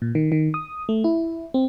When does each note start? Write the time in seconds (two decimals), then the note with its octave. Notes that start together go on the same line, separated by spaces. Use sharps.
0.02 A#2
0.15 D#3
0.32 D#3
0.54 D#6
0.89 A3
1.04 E4
1.54 C4